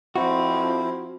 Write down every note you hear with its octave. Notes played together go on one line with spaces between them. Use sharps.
F2 F3 C4 E4 F#4